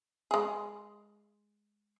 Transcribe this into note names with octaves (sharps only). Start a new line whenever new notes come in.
G#3 G#4